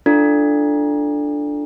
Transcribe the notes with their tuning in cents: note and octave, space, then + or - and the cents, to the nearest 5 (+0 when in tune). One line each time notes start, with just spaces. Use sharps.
D4 +5 F4 -25 A4 +0